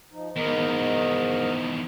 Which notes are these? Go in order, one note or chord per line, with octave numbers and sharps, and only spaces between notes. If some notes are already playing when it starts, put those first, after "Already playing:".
F3 D#4
E2 G#2 D#3 A#4 D#5